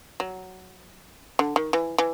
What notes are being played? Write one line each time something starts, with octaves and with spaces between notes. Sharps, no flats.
F#3
D3
D#3
E3
E3